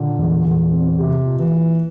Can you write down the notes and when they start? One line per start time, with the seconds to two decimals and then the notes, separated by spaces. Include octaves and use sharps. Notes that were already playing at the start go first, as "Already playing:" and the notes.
Already playing: A#2 D3
0.19 E2
0.46 E2
0.71 C4
0.98 C3 G4
1.25 A#2
1.39 E3
1.52 E4